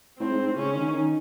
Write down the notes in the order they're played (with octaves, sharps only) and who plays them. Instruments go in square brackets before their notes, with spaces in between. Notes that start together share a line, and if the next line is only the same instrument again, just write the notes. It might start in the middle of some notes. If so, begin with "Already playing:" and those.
[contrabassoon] A2 [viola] C4
[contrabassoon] G#2
G#2
A2
[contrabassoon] C#3 [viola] C#4
[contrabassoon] D#3
D#3